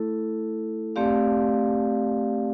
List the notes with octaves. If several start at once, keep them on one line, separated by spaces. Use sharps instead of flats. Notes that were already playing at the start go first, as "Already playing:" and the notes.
Already playing: A3 E4 A4
A3 C4 G4 D5 F5